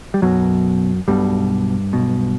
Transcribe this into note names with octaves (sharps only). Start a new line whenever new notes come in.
G3
B1 F#2 B2 F#3
B1 G2 B2 G3
B1 B2